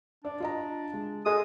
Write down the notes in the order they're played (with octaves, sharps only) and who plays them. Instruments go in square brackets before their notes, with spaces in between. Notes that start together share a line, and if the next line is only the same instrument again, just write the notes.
[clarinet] D4 [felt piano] D5
[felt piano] F4 D#5 A#5
G#3
[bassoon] G#3 [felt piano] A4 [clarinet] D#6